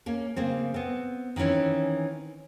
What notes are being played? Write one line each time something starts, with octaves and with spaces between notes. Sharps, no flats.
A#3 C#4
C#3 A#3 C4
B3 C4
D#3 E3 C4 C#4 E4